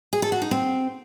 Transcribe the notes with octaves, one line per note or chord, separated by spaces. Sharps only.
G#4
A4
F#4
D#4
C4